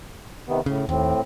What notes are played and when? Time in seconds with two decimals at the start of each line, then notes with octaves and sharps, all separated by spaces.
0.48 C3 D#3 B3
0.66 A2 C#3
0.89 D#2 A2 C4